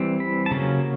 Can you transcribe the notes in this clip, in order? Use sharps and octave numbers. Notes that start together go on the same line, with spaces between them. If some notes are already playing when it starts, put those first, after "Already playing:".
Already playing: E3 G3 C4
B5
A5
C#3 F#3 A#3 C#4 A#5